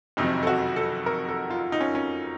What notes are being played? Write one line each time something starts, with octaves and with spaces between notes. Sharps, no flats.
F#1 F2 C3 D#3 F#3 D#4
A4
F#4
A4
A#4
A4
F4
D#4
C#4
C#4